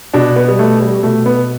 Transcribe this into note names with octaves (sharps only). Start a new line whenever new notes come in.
B2 D4
B3
G3
A3
G3
B2 A3
B3